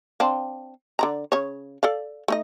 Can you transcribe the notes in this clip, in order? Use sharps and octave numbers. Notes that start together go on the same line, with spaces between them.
C4 D4 F5
D3 D5 A#5
C#3 C#5
A4 D5 F5
A3 D#4 D#5